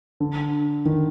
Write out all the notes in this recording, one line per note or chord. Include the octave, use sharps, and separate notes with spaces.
D3
D#3